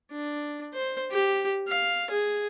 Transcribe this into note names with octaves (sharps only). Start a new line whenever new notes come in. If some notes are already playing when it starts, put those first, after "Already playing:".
D4
C5
G4
F5
G#4